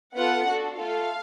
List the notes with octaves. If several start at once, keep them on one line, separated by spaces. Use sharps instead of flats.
B3 F4 A4 F#5
D4 F#4 A4
A3 F4 A4 F5